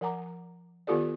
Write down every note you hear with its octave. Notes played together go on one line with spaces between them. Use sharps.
F3 A#4 F#5 G#5 A#5 D6
D#3 B3 F4 G4 A4 D5